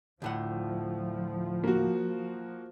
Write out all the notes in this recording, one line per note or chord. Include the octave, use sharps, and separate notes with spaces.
D2 A2 F3 F#5
A#3 F#4